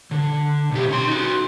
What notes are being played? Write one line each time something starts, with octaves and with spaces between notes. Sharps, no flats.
D3
B1 G4
C#4 C6
D#4 F#4